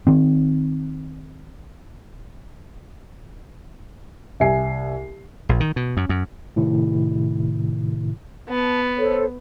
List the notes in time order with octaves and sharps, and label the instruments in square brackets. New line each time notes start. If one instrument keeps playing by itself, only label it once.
[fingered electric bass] D#3 C4
[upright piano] C2 E5 G#5 C7
[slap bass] A#1
D#3
B2
F#2
F#2
[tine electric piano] A2 C3 D#3 E4
[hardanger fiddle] B3 [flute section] A5
[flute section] A4 C5 C#5